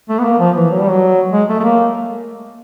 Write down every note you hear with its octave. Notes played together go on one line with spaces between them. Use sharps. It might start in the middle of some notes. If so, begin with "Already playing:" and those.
A3
B3
A#3
F3
E3
F#3
G3
F#3
G#3
A3
A3
A#3